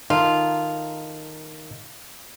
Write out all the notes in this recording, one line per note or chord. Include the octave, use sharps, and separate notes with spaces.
D#3 D#4 F4 A4